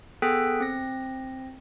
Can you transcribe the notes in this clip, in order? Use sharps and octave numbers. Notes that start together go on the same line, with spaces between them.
B3 G#4 A4 G5 F#6 B6
C4 A#6